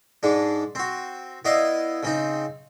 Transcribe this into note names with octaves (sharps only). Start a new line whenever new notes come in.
G#2 G#3 D4
C4 F#4
B3 E4 D5 D#5 F5
C#3 C4 D#4